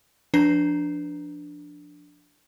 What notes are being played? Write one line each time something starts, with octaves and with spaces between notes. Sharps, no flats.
F3 D4 B4 A#5 C7